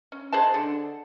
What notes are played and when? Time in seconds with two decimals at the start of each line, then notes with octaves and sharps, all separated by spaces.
0.12 C#4
0.32 G#4 C5 D#5 A5
0.54 D3